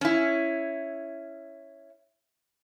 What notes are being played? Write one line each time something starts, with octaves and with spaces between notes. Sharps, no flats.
C#4 E4